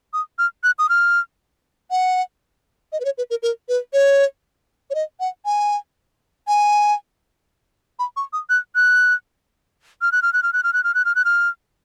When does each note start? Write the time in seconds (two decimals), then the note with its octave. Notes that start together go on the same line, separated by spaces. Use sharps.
0.13 D#6
0.39 F6
0.64 F#6
0.79 D#6
0.89 F6
1.91 F#5
2.92 D#5
3.00 B4
3.05 C#5
3.18 B4
3.30 A#4
3.43 A#4
3.69 B4
3.93 C#5
4.90 C#5
4.95 D#5
5.20 F#5
5.46 G#5
6.48 G#5
7.99 B5
8.17 C#6
8.33 D#6
8.50 F#6
8.76 F#6
10.02 F6
10.12 F#6
10.22 F6
10.33 F#6
10.43 F6
10.53 F#6
10.64 F6
10.73 F#6
10.84 F6
10.95 F#6
11.05 F6
11.15 F#6
11.25 F6